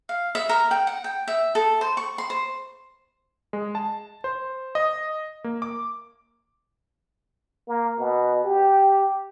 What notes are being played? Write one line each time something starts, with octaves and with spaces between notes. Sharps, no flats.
F5
E5
A#4
G5
F#5
G5
E5
A4
C5
C#6
C6
C5
G#3
A5
C5
D#5
A#3
D6
A#3
B2
G4